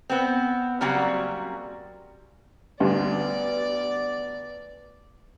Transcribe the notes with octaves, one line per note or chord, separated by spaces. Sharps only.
B3 C4
C#3 F#3 G3 A#3 C4 F#4
A1 D2 G2 B3 D5